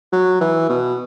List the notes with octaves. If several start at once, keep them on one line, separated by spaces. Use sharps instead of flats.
F#3
E3
B2